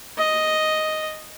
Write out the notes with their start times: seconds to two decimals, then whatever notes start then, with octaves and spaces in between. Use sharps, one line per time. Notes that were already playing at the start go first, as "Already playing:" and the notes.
0.18 D#5